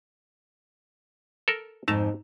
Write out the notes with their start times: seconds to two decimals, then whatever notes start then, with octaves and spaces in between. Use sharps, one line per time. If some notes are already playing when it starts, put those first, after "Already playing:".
1.48 A4 A#4
1.88 F2 G#2 A3 D#4 A5 A#5